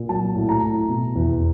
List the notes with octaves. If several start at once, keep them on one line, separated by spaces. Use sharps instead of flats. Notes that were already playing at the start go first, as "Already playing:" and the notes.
Already playing: A#2
F#3 A5
A2
A#5
A2
B2
E2